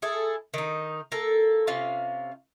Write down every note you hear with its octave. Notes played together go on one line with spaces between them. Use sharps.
E4 G#4 A4
D#3 D#4
A#3 A4
C3 C#4 F4 F5